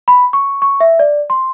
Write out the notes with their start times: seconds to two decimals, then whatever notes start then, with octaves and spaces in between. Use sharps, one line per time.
0.08 B5
0.33 C#6
0.62 C#6
0.80 E5
0.99 D5
1.30 C6